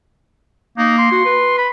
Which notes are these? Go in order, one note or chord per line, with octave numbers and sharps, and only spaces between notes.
A#3 D#4
C6
F#4
B4
B5